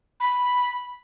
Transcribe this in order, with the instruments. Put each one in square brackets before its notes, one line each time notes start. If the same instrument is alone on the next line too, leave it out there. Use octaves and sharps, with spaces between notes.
[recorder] B5